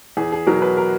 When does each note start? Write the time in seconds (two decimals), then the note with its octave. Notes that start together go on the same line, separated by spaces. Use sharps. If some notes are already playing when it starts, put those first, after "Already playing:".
0.17 E2 G#4
0.32 G#4
0.47 B2 F#3 A#4
0.62 B4
0.77 A#4